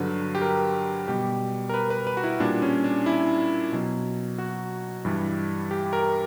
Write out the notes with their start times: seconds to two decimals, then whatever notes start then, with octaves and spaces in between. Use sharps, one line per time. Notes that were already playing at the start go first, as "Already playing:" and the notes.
Already playing: G2 D3 F#3 B4
0.35 G4
0.41 A#4
1.08 B2 G3 G4
1.69 A#4
1.74 B4
1.90 B4
2.07 B4
2.17 F#4
2.24 E4
2.40 A#2 G3 D4
2.62 C#4
2.84 D4
3.06 E4
3.72 B2 F#3
4.38 F#4
5.05 G2 E3 G3
5.71 G4
5.93 A#4